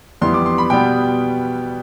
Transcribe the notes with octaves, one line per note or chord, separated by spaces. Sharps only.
F2 E3 G3 B3 C6
D6
C6
B5
B2 G3 B3 G5